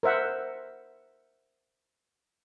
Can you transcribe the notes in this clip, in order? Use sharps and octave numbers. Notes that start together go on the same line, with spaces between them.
A#4 C5 E5 F#5